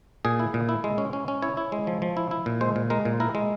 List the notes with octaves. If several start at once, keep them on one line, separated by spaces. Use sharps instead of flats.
A#2 G#4
E4
A#2
E4
G#3
C#4
C#4
C#4
E4 C#5
E4
G#3
F3
F3
E4
E4
A#2
G#3 C5
A#2
G#3 A#4
A#2
E4 A#4
G#3